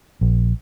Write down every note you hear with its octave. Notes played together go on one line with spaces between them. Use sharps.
A#1